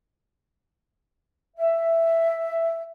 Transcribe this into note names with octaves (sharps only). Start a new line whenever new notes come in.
E5